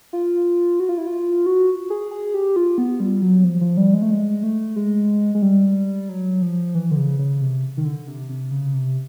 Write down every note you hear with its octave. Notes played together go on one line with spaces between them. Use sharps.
F4
F#4
F4
E4
F4
F#4
G#4
G#4
G4
F4
B3
G3
F#3
F3
F3
G3
G#3
A3
G#3
A3
G#3
G#3
G3
F#3
F3
E3
D3
C#3
C#3
C3
D#3
D3
C3
C3
C#3
C3